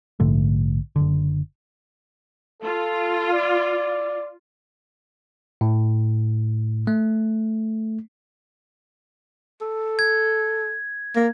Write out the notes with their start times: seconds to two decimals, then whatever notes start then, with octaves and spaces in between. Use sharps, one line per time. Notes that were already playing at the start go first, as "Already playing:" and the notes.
0.20 A#1 G#2 D3 A3
0.96 F#1 B1 D3
2.62 F4 A4
3.33 D5
5.61 A2
6.87 A3
9.61 A4
9.99 G#6
11.16 A#3